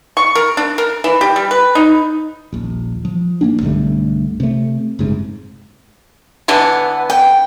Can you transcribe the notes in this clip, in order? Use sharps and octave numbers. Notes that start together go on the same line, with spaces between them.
C#6
A#4
D4
A#4
E3
G4
G3
B4
D#4
D#1 A#1
F3
A1 A#3 D4
B1 G2 D3 A3
C3 A3
F#1 G#2 C3
D3 E3 B3
G5